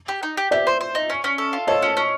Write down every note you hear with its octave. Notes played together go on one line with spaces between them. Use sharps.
G4
D#4
G4
G4 D5 E5
C5
C5
D#4
C#4
C#4
A4
F4
A4 C#5 D#5
C#4
C#4